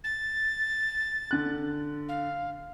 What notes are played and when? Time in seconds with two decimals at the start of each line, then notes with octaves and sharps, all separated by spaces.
0.04 A6
1.31 D3 F#6
2.08 F5